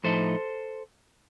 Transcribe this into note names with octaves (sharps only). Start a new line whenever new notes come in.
A2 F3 A3 D#4 A4 C5